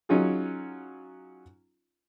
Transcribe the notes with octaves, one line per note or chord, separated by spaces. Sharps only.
F#3 C#4 D#4 F4 G#4